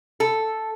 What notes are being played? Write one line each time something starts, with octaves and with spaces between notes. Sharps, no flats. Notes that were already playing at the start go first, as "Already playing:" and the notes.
A4